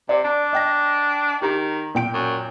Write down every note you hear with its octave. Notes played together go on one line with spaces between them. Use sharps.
C3 D5
D4
D#5 G5 A#6
D#3 G4 A#5
A#2 G5 D7
F#2